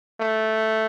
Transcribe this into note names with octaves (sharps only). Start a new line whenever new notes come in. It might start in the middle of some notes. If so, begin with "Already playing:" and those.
A3